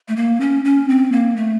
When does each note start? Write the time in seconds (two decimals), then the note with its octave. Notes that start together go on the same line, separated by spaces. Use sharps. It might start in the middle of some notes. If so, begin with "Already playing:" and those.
0.08 A3
0.16 A#3
0.40 C#4
0.65 C#4
0.89 C4
1.12 A#3
1.36 A3